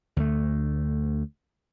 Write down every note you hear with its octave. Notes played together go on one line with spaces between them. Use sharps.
D2 A3